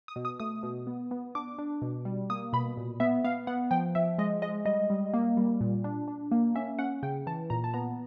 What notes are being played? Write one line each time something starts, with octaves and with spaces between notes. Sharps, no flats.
D#6
B2
D#6
A3 D#6
B2
B3
B3
D4 D6
D4
B2
G3
A#3 D#6
B2 B5
A#2
B3 E5
B3 F5
B3 F#5
F3 G5
F3 E5
G#3 D#5
G#3 D#5
G3 D#5
G3
A#3
G3
A#2
D4
D4
A#3
C#4 E5
C#4 F#5
C#3 G5
E3 A5
A#2 A#5
A5
B3 A#5